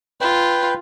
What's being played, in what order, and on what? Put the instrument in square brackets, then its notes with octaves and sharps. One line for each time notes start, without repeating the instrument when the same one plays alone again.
[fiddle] F4 [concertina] B4 G5